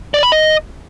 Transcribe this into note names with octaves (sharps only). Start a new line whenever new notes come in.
D5
B5
D#5